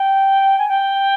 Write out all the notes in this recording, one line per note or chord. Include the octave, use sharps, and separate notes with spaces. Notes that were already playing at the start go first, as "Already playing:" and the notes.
Already playing: G5
G#5
G5